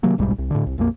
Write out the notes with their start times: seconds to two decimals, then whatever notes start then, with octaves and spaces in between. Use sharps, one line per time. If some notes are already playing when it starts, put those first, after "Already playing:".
0.03 C3 D#3 F#3 A#3
0.18 D#1 B1 G#2 G3
0.38 C2
0.51 A2 D3
0.66 C2
0.78 A#1 F2 F3 A#3